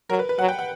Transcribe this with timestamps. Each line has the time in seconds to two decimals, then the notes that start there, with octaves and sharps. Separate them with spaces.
0.10 F#3 A#4
0.19 B4
0.29 B4
0.39 F#3 F#5
0.48 G5
0.59 F#5